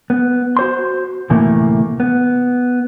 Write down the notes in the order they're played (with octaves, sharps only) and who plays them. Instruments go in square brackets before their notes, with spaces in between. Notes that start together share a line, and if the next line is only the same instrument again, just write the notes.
[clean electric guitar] B3
F#4 C5 C6
D2 A2 C3 E3 A3 A#3
B3